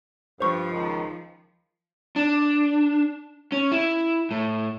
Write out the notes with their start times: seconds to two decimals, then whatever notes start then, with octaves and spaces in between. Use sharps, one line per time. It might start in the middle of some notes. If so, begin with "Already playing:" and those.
0.40 G2 F3 C5 C#6
0.72 C#2 D#3
2.16 D4
3.52 C#4
3.72 E4
4.31 A2